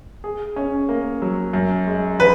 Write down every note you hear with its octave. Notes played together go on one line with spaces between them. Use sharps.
G#4
C#4
A#3
F#3
F#2
G#3
F3 B4